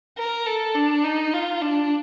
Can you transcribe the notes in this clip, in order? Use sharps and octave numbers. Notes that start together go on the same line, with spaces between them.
A#4
A4
D4
D#4
F4
D4